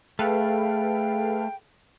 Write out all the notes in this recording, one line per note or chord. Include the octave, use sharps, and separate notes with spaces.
A3 G#4 A4 B4 F5 G5